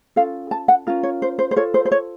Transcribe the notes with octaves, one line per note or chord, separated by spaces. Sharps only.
C#4 F4 A4 F5
A5
F#5
C#4 F4 A#4
C#5
C5
C5
C5
F4 A4 C#5
C5
C5
C#5